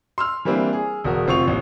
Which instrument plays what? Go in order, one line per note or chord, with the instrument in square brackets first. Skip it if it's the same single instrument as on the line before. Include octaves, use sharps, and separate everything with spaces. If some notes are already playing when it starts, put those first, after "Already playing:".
[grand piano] C6 E6 F6
E3 G3 A#3 C4 D4 E4
G#4
E1 F#4 A#4
F1 C4 F4 C#6 F7
A1 D#2